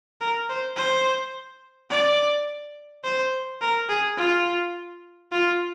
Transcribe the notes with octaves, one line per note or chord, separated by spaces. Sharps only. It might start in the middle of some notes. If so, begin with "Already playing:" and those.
A#4
C5
C5
D5
C5
A#4
G#4
F4
F4